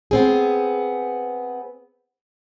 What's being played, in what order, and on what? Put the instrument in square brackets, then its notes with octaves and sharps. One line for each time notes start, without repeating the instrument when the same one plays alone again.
[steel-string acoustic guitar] B3 C4 G#4